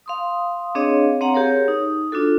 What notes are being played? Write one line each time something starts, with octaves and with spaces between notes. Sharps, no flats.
F5 C6 D#6
C4 D4 G#4 C#5 D#5 F5
C4 C#5 F5 F#5 A#5
G4 G#4 A#4 C#5
D#4
D4 F4 F#4 A4